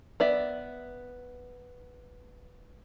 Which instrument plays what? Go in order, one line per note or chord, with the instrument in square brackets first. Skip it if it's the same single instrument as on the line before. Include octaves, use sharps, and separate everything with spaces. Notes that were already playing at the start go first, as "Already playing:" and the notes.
[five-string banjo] B3 D5 E5